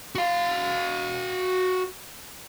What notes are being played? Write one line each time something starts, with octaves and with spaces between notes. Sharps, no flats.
F#4 F5